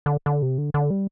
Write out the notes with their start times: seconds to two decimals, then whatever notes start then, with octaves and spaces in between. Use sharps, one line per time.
0.06 D3
0.26 D3
0.42 C3
0.58 D3
0.74 D3
0.90 G3